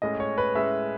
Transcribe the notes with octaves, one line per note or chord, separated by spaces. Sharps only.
A2 G#3 C#4 D#5
C#5
B4
A2 G#3 C#4 E5